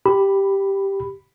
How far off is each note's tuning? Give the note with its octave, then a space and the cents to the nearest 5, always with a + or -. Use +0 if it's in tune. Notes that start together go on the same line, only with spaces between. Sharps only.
G4 +0 B5 +0